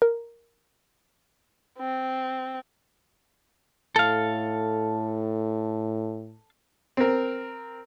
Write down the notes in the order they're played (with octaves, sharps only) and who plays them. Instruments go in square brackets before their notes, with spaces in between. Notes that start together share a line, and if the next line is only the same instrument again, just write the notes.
[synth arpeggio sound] A#4
[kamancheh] C4
[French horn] A2 [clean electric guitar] A4 F5
[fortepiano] C4 A#4